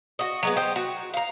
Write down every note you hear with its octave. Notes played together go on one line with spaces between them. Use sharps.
F#4 D#5
F#3 G#3 B3
G4 C5 D#5
F#4
F5 A#5